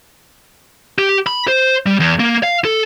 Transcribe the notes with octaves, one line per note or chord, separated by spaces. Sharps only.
G4
B5
C5
G3
E2
A#3
F5
A4